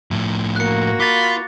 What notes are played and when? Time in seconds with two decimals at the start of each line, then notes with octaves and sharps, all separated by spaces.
0.11 A2 F3
0.56 A#3 F#4 F#6 C#7
1.00 F4 B5 D6 A6